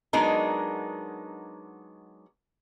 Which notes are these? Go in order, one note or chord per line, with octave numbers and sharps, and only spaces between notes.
F#3 G#3 B3 D4 D#4 A#4